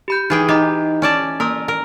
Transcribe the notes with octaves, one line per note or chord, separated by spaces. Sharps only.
G4 B5 G6
E3 D#4 G#4 G5
D#4 G4 D#5 A#5
C#4 D5 A5
A#3 A#4 A#5 D#6
A#4